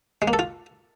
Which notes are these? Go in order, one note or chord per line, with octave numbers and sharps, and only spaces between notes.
G#3
A#3
A4
F4